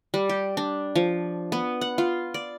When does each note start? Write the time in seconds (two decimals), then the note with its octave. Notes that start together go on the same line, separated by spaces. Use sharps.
0.14 G3
0.29 G4
0.57 D4
0.95 F3
1.52 B3
1.81 F#5
1.98 F4
2.34 D5